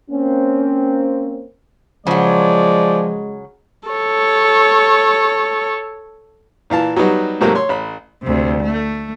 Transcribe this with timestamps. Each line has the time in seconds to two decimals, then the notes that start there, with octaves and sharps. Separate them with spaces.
0.11 A#3 C4 C#4
2.07 C#3 F3 F#3 G#3 D5
3.89 A4 C#5
6.70 A#2 E3 F5 A5
6.96 F#3 G3 B3 D#4 F#4
7.41 G#2 C3 F#3 A3 A#3
7.55 C#5 C6
7.69 A1 B5
8.23 D2 C3
8.61 A3